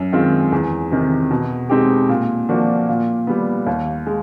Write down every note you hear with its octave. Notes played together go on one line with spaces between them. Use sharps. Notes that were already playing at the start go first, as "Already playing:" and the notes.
Already playing: F#2
D#3 G#3 C4 F4
E2
C3 D#3
B2
G#3 C4 D#4 G4
A#2
F3 A#3 D4 F#4
A#2
G3 B3
D#2
G#3